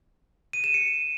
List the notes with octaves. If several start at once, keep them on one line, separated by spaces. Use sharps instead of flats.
D#7
E7
C#7